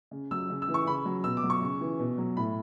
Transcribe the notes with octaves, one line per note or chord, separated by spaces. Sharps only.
C#3
F#3 E6
C#3
E6
E3
C#6
C#3 B5
F#3
B2 E6
D6
F#3
C#6
C#3
E3
B2
F#3
A2 B5